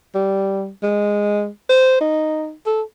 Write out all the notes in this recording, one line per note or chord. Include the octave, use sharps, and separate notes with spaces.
G3
G#3
C5
D#4
A4